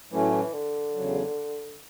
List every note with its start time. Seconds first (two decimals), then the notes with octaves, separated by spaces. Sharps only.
0.11 A2 E3 F#3 A3 C#4
0.32 E3
0.53 D3
0.94 E2 C#3 F#3